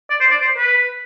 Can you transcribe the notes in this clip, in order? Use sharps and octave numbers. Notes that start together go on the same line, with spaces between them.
D5
C5
D5
C5
B4